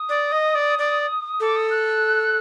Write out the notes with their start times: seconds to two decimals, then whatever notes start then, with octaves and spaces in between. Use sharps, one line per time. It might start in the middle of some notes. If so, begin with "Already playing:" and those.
Already playing: D#6
0.09 D5
0.32 D#5
0.55 D5
0.79 D5
1.40 A4 D6
1.56 D#6
1.71 F#6